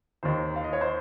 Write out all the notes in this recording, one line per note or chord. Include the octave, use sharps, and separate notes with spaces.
D#2 D#3 C5
F5
D#5
C#5
C5